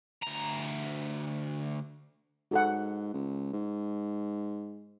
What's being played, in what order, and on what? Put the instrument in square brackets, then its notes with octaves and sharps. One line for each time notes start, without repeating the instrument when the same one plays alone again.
[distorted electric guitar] D2 A#5
[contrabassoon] G#2 [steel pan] F#4 A4 F#5
[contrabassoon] C#2
G#2